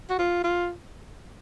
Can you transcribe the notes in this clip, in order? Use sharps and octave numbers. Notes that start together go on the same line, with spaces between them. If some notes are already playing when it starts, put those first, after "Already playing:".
F#4
F4
F4